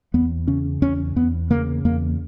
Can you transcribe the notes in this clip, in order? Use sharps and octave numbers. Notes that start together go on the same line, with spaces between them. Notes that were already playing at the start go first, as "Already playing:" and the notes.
E2 B3
C#3 C#4
E2 C#4
E2 B3
C#3 A#3
E2 A#3